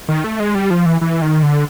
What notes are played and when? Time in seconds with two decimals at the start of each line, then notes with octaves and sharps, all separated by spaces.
0.08 D#3
0.24 A3
0.40 G#3
0.55 G3
0.70 F3
0.86 E3
1.01 E3
1.22 D#3
1.43 D3